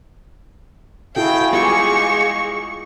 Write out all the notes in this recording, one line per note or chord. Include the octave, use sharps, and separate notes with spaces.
E4 F#4 G#4 A4 F5 G5
G#3 B3 F4 G4 C#6